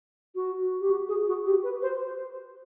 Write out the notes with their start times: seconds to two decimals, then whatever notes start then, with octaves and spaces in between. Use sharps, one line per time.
0.36 F#4
0.81 G4
0.91 F#4
1.09 G#4
1.28 F#4
1.46 G4
1.64 B4
1.82 C5